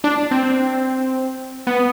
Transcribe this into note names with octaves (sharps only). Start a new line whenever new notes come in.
D4
C4
B3